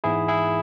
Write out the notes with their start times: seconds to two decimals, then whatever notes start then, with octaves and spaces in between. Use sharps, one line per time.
0.04 G#2 E3 G#3 B3 E4 G#4
0.28 E4 G#4